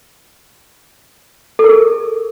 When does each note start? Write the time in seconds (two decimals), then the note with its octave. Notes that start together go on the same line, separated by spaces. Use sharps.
1.59 A4
1.64 A#4
1.69 G#4